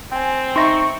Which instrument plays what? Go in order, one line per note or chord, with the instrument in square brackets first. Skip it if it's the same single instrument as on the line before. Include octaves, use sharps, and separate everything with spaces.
[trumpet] C4 [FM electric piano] G5 G#5
[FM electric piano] D#4 E5 A#5 [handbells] C6 A#6 [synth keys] C#6